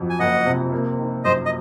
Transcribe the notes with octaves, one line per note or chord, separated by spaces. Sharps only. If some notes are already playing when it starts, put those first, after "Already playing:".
Already playing: F2 F#3
G#5
F#1 D#5 F#5
C3
A#3
D#3
F#2 C5 D#5
D#5